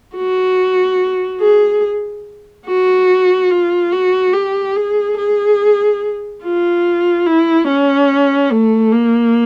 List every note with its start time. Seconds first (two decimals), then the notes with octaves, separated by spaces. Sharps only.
0.16 F#4
1.41 G#4
2.66 F#4
3.51 F4
3.92 F#4
4.33 G4
4.76 G#4
5.18 G#4
6.43 F4
7.27 E4
7.68 C#4
8.52 A3
8.93 A#3